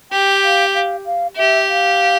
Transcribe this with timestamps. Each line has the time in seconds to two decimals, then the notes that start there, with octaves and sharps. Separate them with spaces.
0.12 G4 G5
0.44 F5
0.75 F5
1.05 F5
1.36 G4 E5
1.69 F5